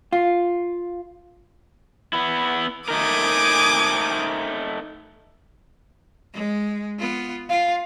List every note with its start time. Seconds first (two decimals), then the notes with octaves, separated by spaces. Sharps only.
0.13 F4
2.13 B3 E4
2.88 A3 D#4 A#4 G#5 D6 D#6
6.33 G#3
6.99 B3 F4
7.49 F4 F5